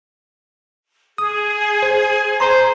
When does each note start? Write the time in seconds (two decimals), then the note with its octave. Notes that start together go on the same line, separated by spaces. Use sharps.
1.18 G#4 D#6
1.82 C5
2.40 C5 A#5